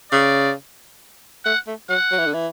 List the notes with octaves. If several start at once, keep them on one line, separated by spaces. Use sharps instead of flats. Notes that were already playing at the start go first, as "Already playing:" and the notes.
C#3 D5
A3 F#5
A3
F#3 F#5
F#3
E3
D3
E3